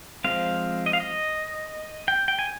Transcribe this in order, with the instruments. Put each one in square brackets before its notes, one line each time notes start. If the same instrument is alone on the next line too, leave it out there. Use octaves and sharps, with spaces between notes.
[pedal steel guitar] F3 G#3 C4 F5
D#5
F5
D#5
G5
G5
G#5